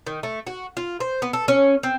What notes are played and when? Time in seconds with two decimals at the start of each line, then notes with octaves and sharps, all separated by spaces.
0.07 D#3
0.23 A3
0.47 F#4
0.77 F4
1.00 C5
1.22 B3
1.33 A4
1.48 C#4
1.83 C4